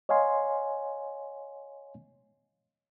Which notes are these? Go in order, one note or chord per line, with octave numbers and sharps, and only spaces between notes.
C#5 D#5 F5 G#5 C6